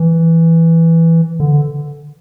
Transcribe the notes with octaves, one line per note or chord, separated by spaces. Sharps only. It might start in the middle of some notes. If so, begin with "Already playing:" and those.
Already playing: E3
D3